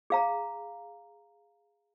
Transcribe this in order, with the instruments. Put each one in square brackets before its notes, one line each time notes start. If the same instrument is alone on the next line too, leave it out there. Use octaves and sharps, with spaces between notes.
[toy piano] G#4 F5 A#5